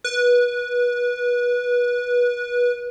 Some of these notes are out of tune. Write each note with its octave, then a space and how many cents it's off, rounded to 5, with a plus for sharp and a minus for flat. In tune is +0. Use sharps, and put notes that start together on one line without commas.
B4 -20